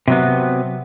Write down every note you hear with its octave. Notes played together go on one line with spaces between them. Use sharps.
C3 F#3 B3